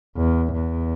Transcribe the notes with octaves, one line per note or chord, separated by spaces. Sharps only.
E2
E2